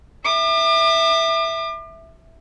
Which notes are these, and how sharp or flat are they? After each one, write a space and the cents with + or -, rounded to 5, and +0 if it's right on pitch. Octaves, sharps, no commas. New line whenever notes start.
E5 +0 D6 +40